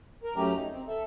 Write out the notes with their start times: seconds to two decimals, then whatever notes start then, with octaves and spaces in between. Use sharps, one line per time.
0.24 A#4
0.36 F#2 F#3 A3 C#4 G4 A#5
0.55 D#4
0.71 C4
0.88 A4 E5